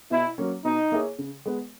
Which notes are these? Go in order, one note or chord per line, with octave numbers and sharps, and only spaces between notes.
B2 E4
F#3 A#3 C#4
B2 D#4
A#3 E4 G#4 C#5
C#3
G#3 B3